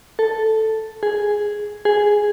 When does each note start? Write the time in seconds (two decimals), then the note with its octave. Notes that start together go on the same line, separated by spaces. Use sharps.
0.19 A4
1.03 G#4
1.85 G#4